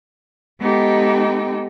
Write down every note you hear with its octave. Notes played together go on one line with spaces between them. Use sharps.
G#3 B3 D#4 G4 A4 G5